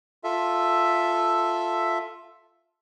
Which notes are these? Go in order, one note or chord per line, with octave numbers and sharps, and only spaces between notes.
F4 A4 E5